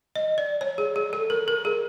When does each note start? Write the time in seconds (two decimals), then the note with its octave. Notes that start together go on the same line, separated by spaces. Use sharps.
0.16 D#5
0.38 D5
0.61 C#5
0.78 G#4
0.96 G#4
1.13 A4
1.30 A#4
1.48 A#4
1.65 G#4